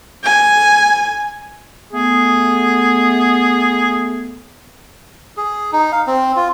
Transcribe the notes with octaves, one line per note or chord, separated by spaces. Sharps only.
G#5
A3 B3 G#4
G#4
D#4
F5
C4
F4